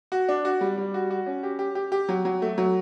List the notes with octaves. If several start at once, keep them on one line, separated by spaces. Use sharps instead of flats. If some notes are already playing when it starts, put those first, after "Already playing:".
F#4
D4
F#4
G3
G3
F#4
F#4
C#4
G4
G4
G4
G4
F#3
F#3
A3
F#3